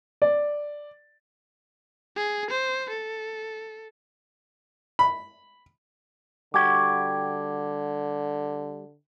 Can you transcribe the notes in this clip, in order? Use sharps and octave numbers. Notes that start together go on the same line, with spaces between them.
D5
G#4
C5
A4
B5
D3 G3 F#4 G4 D6 G#6